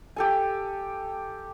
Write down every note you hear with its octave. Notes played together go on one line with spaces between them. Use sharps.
G4 A4 G#5